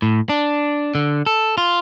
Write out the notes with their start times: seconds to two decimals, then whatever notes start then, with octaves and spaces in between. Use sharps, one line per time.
0.02 A2
0.29 D4
0.95 D3
1.26 A4
1.58 F4